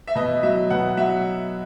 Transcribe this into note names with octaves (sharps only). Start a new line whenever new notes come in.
E5
B2 D#5
F#3 E5
B2 F#5
F#3 E5